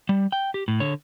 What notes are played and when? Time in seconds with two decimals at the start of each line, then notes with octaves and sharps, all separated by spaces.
0.09 G3
0.32 G5
0.54 G4
0.68 A2
0.80 D3 C#5